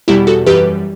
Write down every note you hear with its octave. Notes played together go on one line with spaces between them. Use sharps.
E2 B2 G3 E4 G4
F#4 A4
F#2 E3 G3 G4 B4